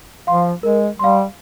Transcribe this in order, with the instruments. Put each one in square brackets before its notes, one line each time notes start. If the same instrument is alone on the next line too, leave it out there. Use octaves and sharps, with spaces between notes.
[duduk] F3 [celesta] F5 C6
[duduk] G#3 [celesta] A#4
[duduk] G3 [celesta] F5 C6